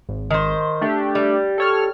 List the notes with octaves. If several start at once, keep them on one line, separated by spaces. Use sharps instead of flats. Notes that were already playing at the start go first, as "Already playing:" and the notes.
G#1
D#3 C5
A3 D4 G4
G3
A4 C#5 F6